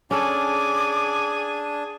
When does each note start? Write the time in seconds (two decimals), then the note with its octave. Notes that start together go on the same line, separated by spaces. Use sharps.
0.11 C#4 D4 G#4 A4 G#5 D6